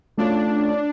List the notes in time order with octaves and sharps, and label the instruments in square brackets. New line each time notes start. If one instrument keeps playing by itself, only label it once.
[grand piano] A3 C#4 F4 C#5 [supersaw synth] D4